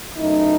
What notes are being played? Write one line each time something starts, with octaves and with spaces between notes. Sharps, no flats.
F#2 E3 A3 D#4